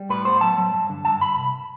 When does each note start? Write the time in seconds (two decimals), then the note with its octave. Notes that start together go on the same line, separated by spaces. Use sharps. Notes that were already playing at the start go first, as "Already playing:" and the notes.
Already playing: G3
0.09 A2 B4
0.25 B3 C5
0.41 F#3 A5
0.58 F#3
0.74 G2
0.89 D3
1.05 G2 A5
1.20 G2 B5
1.37 C2